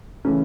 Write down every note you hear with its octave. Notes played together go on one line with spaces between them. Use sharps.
C#3 E3 A3 C#4